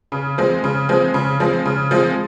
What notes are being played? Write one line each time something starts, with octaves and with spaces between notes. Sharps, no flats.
C#3
F3 G#3 C4
C#3
F3 G#3 C4
C#3
F3 G#3 C4
C#3
F3 G#3 C4